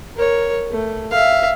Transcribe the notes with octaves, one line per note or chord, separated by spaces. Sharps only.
A#4 C#5
A3
E5 F5